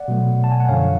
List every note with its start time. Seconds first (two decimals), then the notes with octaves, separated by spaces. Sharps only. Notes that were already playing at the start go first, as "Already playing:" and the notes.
Already playing: D5 F#5
0.08 B2 F#3 A3
0.44 A5
0.52 G#5
0.60 F#5
0.68 F#2 D3 F3 C#5 F5